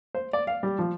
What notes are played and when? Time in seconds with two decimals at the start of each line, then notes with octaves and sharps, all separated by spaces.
0.15 C5
0.33 D5
0.47 F5
0.63 G3
0.79 F3